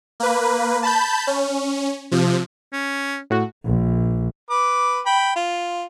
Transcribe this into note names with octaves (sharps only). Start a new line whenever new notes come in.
A#3 B4
A5 B5 G6
C#4
C3 F3
C#4
A2 F#4
A#1
B4 D6
G5 B5
F4